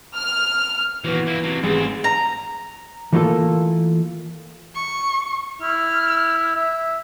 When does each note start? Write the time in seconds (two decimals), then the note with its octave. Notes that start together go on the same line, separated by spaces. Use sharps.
0.15 F6
1.04 A#2 E3 F#3 B3
1.27 A#3 E4
1.43 C3 F#3
1.63 A1 G#2 C4 G#4
2.04 A#5
3.13 E3 A3 A#3 F4 A4
4.75 C#6
5.62 E4 F6
6.55 E5